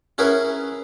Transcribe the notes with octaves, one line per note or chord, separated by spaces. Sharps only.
C#4 E4 F#4 G#4 A#4 B4